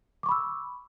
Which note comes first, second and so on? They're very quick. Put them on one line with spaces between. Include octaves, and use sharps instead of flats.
D6 C#6 B5 E6